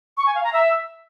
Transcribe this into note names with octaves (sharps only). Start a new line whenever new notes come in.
C#6
G#5
F5
A#5
E5